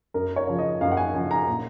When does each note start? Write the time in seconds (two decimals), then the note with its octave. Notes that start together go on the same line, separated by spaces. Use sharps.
0.14 F#2 A#4
0.36 C#5
0.47 C#3 F3
0.59 D#5
0.81 F#2 F5
0.91 F#5
0.97 G#5
1.14 C#3 F3 G#5
1.31 A#5
1.47 A#2